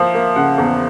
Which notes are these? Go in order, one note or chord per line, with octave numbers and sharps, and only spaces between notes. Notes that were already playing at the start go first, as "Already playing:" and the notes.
Already playing: F3 A#3 E5
A#3
C#3 F#5
E2